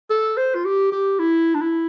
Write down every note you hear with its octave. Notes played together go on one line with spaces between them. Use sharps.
A4
C5
F4
G4
G4
E4
D4
E4